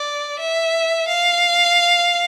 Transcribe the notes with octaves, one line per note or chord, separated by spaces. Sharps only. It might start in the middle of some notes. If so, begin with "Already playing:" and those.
Already playing: D5
E5
F5